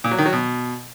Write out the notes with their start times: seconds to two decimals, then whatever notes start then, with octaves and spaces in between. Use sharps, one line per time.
0.04 A#2
0.11 F#3
0.18 D#3
0.26 F#3
0.33 B2